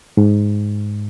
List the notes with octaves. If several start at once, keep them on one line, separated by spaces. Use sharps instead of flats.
G#2